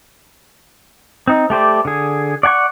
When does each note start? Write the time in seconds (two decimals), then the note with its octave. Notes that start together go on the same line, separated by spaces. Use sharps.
1.28 C4 D#4
1.50 A3 G4 C5 D5
1.85 D3 G#4
2.43 D5 F#5 G#5 C#6